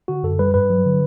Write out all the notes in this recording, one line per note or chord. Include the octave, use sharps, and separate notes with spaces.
D3 F#4
F#2 A4
G3 B4
G2 B4
F#3
D3